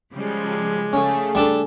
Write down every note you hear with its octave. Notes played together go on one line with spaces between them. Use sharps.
C#3 F3 G3 G#3
A4 D5
C#3 A3 C#4 G#4 F5 G#5
G3 D4 A4